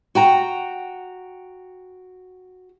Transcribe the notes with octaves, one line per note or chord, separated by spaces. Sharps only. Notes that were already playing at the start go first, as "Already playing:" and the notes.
F#4 G5 A#5